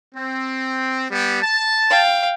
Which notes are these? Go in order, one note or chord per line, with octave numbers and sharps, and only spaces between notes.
C4
G3 B3 G4
A5
F5 G5